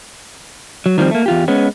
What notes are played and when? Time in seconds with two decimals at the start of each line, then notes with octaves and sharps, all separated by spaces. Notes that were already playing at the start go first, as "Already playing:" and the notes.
0.86 F#3
0.98 D#3 F3 G3 C4
1.11 A3 A#3
1.26 E2 F4 G4
1.48 G#3 B3 C#4